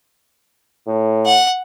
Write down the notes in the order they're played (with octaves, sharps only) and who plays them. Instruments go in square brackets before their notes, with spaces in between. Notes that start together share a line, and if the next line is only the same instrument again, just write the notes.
[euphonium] A2
[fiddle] F#5